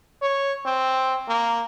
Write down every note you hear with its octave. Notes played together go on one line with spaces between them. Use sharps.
C#5
C4
A#3